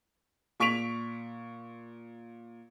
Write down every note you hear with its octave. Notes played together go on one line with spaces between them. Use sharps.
A#2 C#6 B6 D7 F7